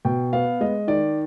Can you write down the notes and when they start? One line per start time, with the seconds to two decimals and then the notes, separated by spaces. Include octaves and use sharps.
0.05 B2 G5
0.33 B3 F5
0.61 G#3 D#5
0.88 D#3 D5